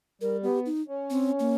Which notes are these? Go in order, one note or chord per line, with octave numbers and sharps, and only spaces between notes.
G3 A#4
B3 G4
D#4
C#4
C4
A#3